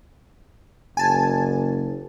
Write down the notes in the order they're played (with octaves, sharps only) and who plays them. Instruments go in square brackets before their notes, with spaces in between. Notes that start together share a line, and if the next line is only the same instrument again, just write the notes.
[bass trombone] F#1 [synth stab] G#5 A5